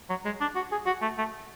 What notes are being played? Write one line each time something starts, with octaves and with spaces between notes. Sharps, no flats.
F#3
G#3
D4
F#4
G#4
F#4
A3
A3